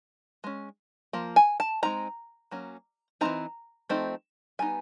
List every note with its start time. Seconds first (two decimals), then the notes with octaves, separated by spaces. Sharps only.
0.44 G#3 C#4
1.13 F3 A#3
1.36 G#5
1.60 A5
1.83 G#3 C4 D#4 A#5
2.51 F#3 A#3 C#4
3.21 E3 A3 C4 D#4 A#5
3.89 F3 A3 C4 D#4
4.59 G3 B3 D#4 G#5